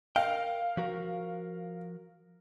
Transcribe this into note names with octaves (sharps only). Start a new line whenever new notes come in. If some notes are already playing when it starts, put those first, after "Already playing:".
A#4 F5 G5
F3 F#4 A#4